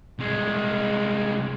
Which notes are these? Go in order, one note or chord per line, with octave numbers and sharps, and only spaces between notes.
C2 G#3